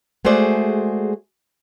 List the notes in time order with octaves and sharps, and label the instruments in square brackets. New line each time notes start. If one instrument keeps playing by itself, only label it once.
[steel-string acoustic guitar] G#3 A3 F#4 G#4 C5 D5